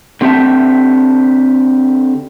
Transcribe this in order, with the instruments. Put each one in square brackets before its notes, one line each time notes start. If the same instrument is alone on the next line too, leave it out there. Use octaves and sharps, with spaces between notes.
[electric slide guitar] D3 C4 G4 A4 E5 A5